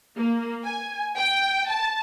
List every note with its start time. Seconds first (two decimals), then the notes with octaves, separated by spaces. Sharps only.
0.16 A#3
0.63 G#5
1.16 G5
1.68 A5